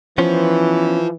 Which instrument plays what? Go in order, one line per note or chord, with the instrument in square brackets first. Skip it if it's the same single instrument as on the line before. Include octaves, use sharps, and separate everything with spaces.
[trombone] E3 [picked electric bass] F3 [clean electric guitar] B3 C#4 C5